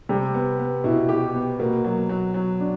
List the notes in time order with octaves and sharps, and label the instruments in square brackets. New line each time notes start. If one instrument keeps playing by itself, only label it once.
[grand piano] C3 [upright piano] G3
[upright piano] B3
B3
[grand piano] B2 [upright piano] E4
[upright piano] G4
B3
[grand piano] B2 [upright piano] A#3
[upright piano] F#3
F#3
F#3
D4